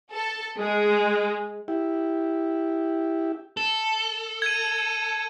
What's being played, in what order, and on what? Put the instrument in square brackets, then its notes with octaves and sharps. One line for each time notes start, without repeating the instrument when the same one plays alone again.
[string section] A4
G#3
[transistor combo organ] E4 G4
[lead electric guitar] A4
[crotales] G#6 D#7